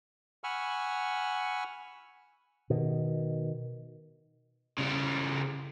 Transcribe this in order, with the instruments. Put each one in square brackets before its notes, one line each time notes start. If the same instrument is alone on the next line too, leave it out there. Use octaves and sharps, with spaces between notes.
[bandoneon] F#5 G#5 B5 C#6 E6 F6
[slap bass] B2 D#3
[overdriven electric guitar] C#3 G3